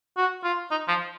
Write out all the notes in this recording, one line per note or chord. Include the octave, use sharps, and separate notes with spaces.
F#4
F4
D#4
F3